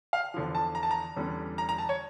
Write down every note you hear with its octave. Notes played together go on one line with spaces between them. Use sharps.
F5
E2 D3 F3
A5
A#5
A5
A#5
E2 D3 G3 C#4
A#5
A#5
A5
C#5